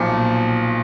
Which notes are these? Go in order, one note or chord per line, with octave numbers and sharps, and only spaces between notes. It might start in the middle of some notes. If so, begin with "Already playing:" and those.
Already playing: B1 A#2 F3